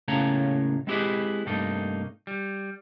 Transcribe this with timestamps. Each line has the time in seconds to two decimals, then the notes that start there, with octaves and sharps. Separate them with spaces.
0.08 A2 C#3 A3 A#3 C#5 A#5
0.87 G#3 C4 E4 G4 G#4 B4
1.46 G2 C3 A3 A#3 D#4
2.27 G3